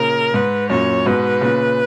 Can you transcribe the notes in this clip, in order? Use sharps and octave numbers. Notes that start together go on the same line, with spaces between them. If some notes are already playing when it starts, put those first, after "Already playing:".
Already playing: A#2 C#3 A#4
G#2 B4
F#2 A#2 C#5
G#2 B2 B4
A#2 C#3